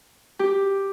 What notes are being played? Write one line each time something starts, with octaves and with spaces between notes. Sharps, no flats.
G4